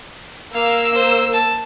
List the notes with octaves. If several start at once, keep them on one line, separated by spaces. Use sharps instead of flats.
A#3 F5 E6
C5
A5